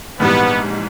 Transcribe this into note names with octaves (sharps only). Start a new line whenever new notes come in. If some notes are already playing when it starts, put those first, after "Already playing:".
A#1 G#2 E3 G3 B3